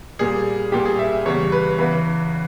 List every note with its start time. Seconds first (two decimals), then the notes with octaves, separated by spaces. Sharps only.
0.19 A#2 G3 G#4
0.72 A#2 G3 G4
0.86 G#4
0.99 E5
1.12 E5
1.25 E2 C#3 G3 C#5
1.52 B4
1.78 E2 C#3 E3 B4